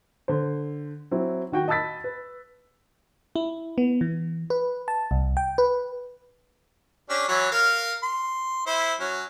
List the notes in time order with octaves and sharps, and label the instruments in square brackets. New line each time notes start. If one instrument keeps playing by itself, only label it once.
[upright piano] D3 C5
F#3 C4 E4
D#3 F#4 G5
D#5 A5 B5 E6 A6 B6
B4
[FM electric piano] E4
B3
E3
B4
A5
C2
G5
B4
[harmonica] C#4 D4 G4
E3 F#3 C#5
A#4 F5
C6
E4 C5
F#3 C#4